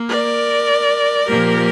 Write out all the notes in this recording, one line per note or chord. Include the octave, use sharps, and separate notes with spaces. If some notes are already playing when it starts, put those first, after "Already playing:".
Already playing: A#3
A#4 D5
A#2 F3 A#3 G4 A#4